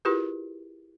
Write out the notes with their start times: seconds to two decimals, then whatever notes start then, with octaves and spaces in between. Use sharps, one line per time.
0.05 E4 F4 G4 G#4 A#4 B4